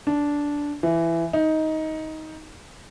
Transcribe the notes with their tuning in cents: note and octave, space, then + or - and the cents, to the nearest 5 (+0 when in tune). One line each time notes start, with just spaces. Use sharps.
D4 -10
E3 +15
D#4 +15